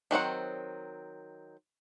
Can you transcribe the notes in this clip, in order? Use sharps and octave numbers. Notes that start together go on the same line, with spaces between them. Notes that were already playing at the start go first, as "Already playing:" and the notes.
D#3 F#3 C4 F#5